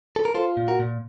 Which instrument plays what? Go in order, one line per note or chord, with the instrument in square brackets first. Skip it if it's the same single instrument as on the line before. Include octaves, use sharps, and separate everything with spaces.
[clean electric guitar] A4
A#4
F4 A4 C5
A#2
F#4 A#4
A#2